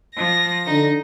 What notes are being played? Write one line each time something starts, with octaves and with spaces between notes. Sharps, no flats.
F3 A#6
D3 D#4